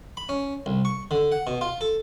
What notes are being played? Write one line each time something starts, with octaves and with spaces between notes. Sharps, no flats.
B5
C#4
C2
C#6
D3
F#5
B2
F4
A4